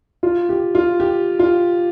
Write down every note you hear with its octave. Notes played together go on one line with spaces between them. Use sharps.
F4
G4
F4
G4
F4